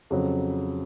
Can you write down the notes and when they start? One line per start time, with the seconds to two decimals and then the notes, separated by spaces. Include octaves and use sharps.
0.10 F2 C#3 F#3